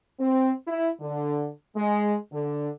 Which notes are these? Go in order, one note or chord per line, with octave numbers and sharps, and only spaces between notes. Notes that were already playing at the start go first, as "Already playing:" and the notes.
C4
E4
D3
G#3
D3